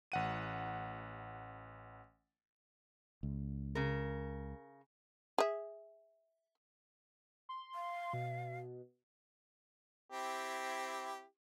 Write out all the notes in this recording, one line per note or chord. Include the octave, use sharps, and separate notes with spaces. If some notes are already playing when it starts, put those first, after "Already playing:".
A1 F#5 D#7
C#2
C#3 A#4
G#4 E5
C6
F5
B2
C4 E4 G4